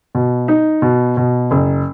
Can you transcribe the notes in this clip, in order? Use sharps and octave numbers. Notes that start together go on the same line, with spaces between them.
B2
D#4
B2
B2
F#1